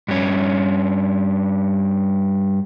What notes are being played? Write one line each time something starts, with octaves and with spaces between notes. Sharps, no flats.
G2 C#4